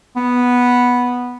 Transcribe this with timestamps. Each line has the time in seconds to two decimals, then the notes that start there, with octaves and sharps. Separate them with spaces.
0.16 B3